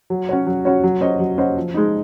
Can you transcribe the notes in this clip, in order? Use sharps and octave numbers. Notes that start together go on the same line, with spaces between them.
F#3
C#4 F#4 C#5
F#3
C#4 F#4 C#5
F#3
C#4 F#4 C5 D#5
F#3
C#4 F#4 C5 D#5
F3
G#3 D#4